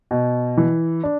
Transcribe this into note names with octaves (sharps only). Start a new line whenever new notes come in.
B2
E3
D4